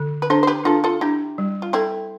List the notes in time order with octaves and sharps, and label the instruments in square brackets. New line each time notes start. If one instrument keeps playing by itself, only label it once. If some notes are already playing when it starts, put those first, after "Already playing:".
Already playing: [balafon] D3
[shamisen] B4
[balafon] D4 [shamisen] A4 C5
[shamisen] C5
G4 B4
[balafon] D4 [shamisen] F4 A4
[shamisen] F4 A4
[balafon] D4 [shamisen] E4 G4
[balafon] G3
[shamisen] F4
[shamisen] C4 E4 [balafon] A4